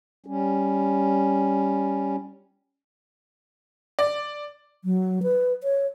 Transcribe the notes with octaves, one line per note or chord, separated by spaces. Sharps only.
G3 C#4
D5
F#3
B4
C#5